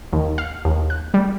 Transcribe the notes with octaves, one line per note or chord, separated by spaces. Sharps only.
D#2
F5
D#2
F#6
G3